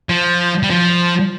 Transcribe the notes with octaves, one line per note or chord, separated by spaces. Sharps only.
F3
G3
F3